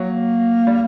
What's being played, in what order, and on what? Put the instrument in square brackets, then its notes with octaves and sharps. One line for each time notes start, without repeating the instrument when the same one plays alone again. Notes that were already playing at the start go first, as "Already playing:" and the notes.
Already playing: [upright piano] F#3 [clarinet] A#3
[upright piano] G3